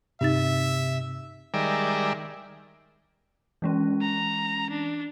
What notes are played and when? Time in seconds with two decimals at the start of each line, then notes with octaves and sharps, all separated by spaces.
0.21 G2 C3 D#4 E5 A6
1.54 D#3 G3 G#3 A#4 D5 E5
3.62 E3 G#3 C#4
4.01 A#5
4.70 D4